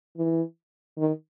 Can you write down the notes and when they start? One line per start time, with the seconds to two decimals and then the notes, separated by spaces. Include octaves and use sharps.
0.17 E3
0.98 D#3